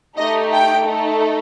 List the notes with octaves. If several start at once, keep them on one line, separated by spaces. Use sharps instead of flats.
A3 D#4 G4 D#5
G5
A3 D#4 A4